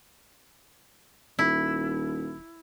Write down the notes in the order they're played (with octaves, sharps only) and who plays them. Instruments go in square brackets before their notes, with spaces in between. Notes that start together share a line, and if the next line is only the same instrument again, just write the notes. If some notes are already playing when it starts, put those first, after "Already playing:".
[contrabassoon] D#1 [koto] E4